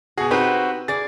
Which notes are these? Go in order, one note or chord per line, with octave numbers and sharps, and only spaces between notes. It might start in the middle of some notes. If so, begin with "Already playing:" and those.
B2 F#4 G#4
C4 D#4 F#4 G4 B4
G#4 D5 A6